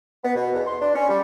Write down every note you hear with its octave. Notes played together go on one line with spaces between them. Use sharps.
B3
B2
E2
C6
D4
C#4
G3